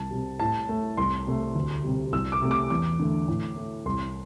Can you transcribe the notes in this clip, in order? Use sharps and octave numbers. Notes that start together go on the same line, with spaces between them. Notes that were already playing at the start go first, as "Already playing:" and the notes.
Already playing: C2 A5
C3 G3
A2 A5
A3
C2 C6
C3 A3
D2
C3 G3
C2 E6
D6
C3 A3
D6
E2 D6
D3 A3
A2
A3
C2 C6